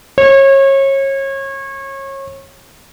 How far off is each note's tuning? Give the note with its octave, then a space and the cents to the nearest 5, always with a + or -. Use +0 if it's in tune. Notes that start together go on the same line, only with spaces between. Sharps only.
C#5 -30